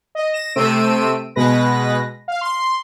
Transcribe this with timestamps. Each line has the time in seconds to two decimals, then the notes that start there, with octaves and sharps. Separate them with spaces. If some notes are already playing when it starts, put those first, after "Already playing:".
0.15 D#5
0.32 A#6 E7
0.56 C3 A3 C4 E6 D7 D#7
1.36 B2 G#3 B4 A#6
2.28 F5
2.41 C6